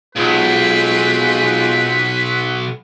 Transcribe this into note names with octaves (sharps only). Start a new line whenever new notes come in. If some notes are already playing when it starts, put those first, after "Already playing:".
B1 G#3 C4 F4 B4